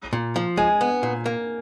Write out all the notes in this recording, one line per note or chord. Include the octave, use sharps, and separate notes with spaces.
A#2
F3
G#3 G#5
B3
A#2
A#3